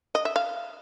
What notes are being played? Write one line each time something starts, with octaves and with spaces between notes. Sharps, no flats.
D#5
E5
F5